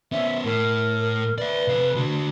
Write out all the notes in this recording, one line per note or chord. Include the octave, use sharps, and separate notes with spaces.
B3 C#4 E5
A2 A#4
B4 D5 E5
C3 F5
D3 F#4